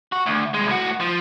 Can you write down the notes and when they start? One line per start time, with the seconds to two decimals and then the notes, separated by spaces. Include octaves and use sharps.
0.12 F#4
0.26 D2
0.54 C2 G#3
0.69 A2 F#4
1.00 F3